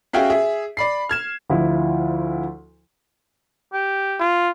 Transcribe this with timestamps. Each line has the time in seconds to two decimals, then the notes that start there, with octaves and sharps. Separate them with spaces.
0.13 C#4 F#4 G#4 E5 F5 G5
0.30 G#4 E5
0.77 D5 B5 C7
1.09 F6 G#6 E7
1.50 D2 F3 E4
3.73 G4
4.20 F4